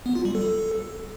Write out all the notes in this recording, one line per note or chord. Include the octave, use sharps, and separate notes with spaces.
B3
F4
G3
A4